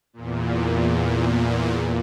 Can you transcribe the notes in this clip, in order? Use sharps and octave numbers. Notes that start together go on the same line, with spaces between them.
E2 A#2